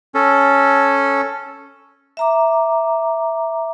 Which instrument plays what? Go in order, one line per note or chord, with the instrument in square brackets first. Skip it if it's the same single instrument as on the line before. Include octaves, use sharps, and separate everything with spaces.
[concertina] C#4 A4
[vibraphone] E5 A#5 D6